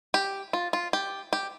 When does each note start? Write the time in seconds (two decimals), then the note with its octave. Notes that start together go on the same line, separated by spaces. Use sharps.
0.14 G4
0.53 F4
0.73 F4
0.93 G4
1.33 G4